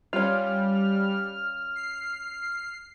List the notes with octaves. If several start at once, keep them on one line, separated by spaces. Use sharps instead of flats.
G3 C#4 F4 F6
C7